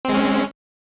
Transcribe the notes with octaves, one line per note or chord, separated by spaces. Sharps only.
G#3 C4 C#4